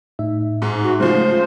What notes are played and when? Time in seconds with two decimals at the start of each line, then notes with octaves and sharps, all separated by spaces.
0.19 A2 D#4 E5
0.62 G#2
0.84 F#4
1.00 C#3 F3 G#3 A3 C5